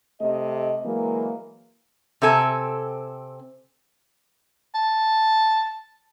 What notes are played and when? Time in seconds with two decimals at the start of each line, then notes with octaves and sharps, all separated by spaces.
0.20 C3 A3 D#5
0.84 E3 F#3 G#3 A#3
2.22 C3 C4 A4 G#5
4.75 A5